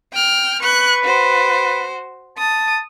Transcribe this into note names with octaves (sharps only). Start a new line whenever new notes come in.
G5 F6
B4 C#6 F#6
F#4 C5
A5 D#6